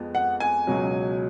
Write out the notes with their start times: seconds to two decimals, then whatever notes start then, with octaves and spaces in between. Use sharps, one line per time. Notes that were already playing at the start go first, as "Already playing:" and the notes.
Already playing: F2 F3 G#3 B3
0.15 F#5
0.40 G#5
0.67 C#2 B2 F#3